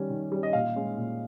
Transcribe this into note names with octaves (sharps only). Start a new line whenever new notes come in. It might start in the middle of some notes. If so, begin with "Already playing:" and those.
Already playing: D#3 G3 C#4
D#3
G3 C#4
D#5
A#2 F5
G#3 C#4
A#2